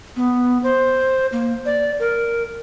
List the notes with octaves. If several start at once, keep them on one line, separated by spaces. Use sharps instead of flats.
B3
C5
A#3
D5
A#4